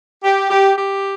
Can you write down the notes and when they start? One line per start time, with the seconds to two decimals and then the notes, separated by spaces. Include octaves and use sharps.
0.24 G4
0.50 G4
0.76 G4